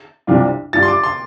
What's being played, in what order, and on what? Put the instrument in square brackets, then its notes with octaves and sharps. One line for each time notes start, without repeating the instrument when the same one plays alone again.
[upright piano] C2 C3 G3 D4 F4
[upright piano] G2 G3 D4 F4 [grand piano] A6
[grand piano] C6
D6
C6